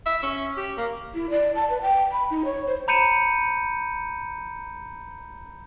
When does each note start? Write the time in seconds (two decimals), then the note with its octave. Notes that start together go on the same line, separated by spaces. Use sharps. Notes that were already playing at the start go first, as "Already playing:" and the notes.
0.06 E5
0.23 C#4
0.57 G4
0.77 A#3
1.14 E4
1.30 D5
1.55 A5
1.70 B4
1.82 G5
2.12 B5
2.30 D#4
2.45 C#5
2.67 C5
2.88 A#5 B5 G6 C#7 D#7 E7